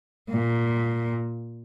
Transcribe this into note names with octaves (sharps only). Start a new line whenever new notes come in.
A#2